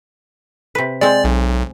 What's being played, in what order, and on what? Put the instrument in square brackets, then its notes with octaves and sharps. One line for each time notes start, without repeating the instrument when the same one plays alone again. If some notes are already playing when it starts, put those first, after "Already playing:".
[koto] C3 B4
[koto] G#3 C4 [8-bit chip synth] D5
[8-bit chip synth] B1